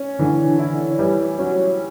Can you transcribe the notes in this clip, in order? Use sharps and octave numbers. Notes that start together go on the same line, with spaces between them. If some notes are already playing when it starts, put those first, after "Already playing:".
Already playing: C#4
D3 E3
D3
E4
D3
E3 G3
F#3 C#4